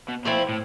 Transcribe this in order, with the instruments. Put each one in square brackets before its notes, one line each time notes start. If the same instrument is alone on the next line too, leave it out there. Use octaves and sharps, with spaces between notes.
[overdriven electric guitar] B2
[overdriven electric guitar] A#2 [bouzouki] F3 A3 C4 E4
[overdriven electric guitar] A2